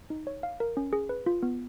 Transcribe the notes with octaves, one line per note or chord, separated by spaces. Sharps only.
D#4
C#5
F5
A#4
C#4
G#4
B4
F4
B3